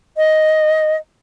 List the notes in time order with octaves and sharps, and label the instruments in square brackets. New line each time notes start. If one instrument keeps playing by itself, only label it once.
[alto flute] D#5